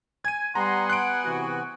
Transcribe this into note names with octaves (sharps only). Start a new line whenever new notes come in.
G#5 G#6 D#7
G3 B3 F#5 G#5 A#5 C6
F#6 D7
C3 E3 F#4